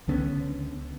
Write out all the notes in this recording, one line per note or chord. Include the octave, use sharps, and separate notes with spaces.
C#2 D3 B3 C#4